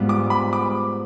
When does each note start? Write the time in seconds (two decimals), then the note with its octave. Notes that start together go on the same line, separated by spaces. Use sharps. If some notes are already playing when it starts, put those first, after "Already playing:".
Already playing: G#2 G3 B3 F4
0.09 D6
0.30 B5
0.53 D6